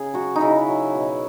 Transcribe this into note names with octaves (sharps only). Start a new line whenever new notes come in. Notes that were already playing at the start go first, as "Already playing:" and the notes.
Already playing: C#3 G#4
F#3 F#4
D#4
C#3 E4
F#3
B2